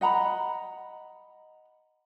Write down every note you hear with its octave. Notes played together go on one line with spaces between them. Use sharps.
D#5 F#5 A#5 B5